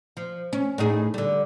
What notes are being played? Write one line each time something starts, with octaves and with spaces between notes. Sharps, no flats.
F3
C#4
A2 D#4 G#4
D3 G3